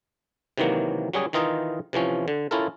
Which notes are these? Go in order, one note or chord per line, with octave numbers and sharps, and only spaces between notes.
C3 D#3 E3 F#3 A#3
F#3 G3 C#4 G#4
D#3 E3 D#4 F4 D#5 A#5
C3 E3 F3 C#4
D3
C#4 E4 F4 A4 A#4